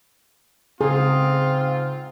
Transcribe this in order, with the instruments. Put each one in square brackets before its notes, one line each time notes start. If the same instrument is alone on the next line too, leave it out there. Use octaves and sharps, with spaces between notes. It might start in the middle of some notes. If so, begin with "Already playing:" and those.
[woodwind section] G#2 C4 [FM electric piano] C#3 [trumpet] F4 [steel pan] G#4